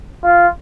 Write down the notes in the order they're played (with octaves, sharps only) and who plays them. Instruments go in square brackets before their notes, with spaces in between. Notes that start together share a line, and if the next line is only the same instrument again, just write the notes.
[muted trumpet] F4